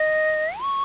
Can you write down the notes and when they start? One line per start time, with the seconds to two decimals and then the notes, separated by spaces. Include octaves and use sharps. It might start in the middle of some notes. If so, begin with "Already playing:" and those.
Already playing: D#5
0.61 C#6